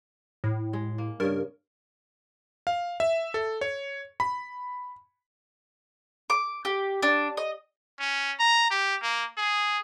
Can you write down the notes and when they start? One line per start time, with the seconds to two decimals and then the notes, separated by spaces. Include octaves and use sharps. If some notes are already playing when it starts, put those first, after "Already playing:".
0.44 A2
0.73 G#3
0.98 A#3
1.20 G2 C#3 A#4
2.67 F5
3.00 E5
3.34 A4
3.61 C#5
4.20 B5
6.30 D6
6.65 G4
7.02 D4
7.37 D#5
8.00 C#4
8.40 A#5
8.71 G4
9.02 A#3
9.38 G#4